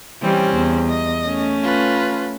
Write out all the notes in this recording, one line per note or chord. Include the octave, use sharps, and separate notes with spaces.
E3 G3 C4 C#4
E2
D#5
A3 C#4
F4 B4